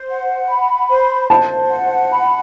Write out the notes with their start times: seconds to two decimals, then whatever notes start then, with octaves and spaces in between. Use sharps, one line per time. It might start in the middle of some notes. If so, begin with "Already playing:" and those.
Already playing: C5
0.08 F#5
0.49 B5
0.89 C5
1.30 C5 A5
1.70 F#5
2.11 B5